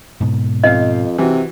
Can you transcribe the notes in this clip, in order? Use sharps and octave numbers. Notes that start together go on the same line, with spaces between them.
G#2 B2
F2 C4 D#5 F5
C3 E3 F#4